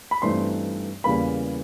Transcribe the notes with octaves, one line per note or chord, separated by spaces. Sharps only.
B5
G2 E3 A3 C4 D#4 C6
E2 C#3 E3 G3 A#3 B5